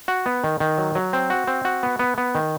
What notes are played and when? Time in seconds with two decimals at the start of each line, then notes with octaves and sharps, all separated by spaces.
0.08 F#4
0.26 B3
0.44 D#3
0.60 D#3
0.78 F#3
0.95 F#3
1.13 C4
1.30 F#4
1.47 C4
1.65 F#4
1.83 B3
1.99 B3
2.18 B3
2.35 D#3